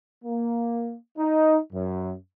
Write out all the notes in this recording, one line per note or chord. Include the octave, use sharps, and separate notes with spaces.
A#3
D#4
F#2